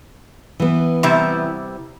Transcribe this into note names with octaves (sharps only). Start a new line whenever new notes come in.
E3 B3
C3 G3 E4